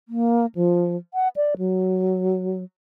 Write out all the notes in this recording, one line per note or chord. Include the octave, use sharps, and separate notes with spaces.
A#3
F3
F#5
D5
F#3